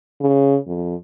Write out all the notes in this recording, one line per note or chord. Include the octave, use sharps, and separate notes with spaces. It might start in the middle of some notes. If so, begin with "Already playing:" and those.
C#3
F2